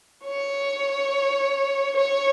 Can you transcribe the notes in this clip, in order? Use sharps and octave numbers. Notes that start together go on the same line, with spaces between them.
C#5
C#5